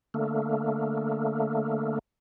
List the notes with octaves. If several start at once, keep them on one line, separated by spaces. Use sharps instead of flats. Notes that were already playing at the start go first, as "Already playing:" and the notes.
D3 A3 A#3